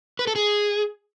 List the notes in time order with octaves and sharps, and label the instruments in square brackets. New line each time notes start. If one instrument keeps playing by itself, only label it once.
[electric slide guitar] B4
A4
G#4